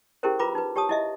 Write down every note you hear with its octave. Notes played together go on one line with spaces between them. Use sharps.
C#4 E4 G4 G#4 A#4 C5
F4 B4 A#5 B5 D6
D#4 B4
G4 C#5 A5 D#6
E4 D#5 E5